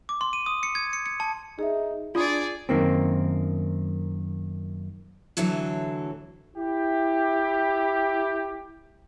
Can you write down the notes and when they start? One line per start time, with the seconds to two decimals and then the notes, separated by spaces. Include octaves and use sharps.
0.09 D6
0.21 C6
0.33 D#7
0.46 D#6
0.63 C#7
0.75 G#6
0.93 C#7
1.06 C#7
1.20 A5
1.59 D#4 G#4 E5
2.15 D4 F4 G#4 D5 B5 D#6 G#6
2.69 F#2 D#3 A#3 C4
5.37 A2 D3 E3 F#3 A4
6.57 E4 G4